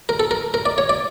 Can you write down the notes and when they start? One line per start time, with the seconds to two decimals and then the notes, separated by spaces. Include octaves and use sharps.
0.09 A#4
0.20 A4
0.31 A#4
0.54 A#4
0.66 D5
0.78 C#5
0.89 D5